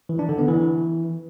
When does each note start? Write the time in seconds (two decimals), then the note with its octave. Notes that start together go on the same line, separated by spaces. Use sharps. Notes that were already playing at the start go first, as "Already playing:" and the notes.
0.09 E3
0.19 D4
0.29 D3
0.39 B3
0.48 E3